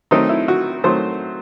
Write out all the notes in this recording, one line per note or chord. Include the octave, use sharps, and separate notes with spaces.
D#3 F#3 A3 C4 D#4
E4
F#4
D#3 F#3 A3 C4 C5